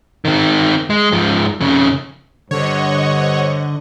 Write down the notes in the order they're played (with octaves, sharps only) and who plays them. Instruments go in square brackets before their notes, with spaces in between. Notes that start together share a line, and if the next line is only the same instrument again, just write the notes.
[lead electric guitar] D#3 C4
G#3
G#2 F3
F2 C#3
[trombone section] G2 C5 [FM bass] D3 [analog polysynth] C#5 [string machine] D#5 F#5 C#6